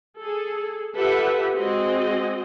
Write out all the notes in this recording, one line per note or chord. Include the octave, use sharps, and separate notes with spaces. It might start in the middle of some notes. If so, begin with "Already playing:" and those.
G#4 A4
F4 G4 A4 B4 E5 F#5
G#3 C4 F#4 G#4 D#5